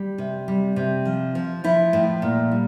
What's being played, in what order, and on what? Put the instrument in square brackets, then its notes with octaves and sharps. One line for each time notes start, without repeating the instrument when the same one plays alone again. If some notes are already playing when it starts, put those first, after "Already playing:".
Already playing: [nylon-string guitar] G3
C3
G3
C3
F3
F3
F3 E4
A2
A#2
G3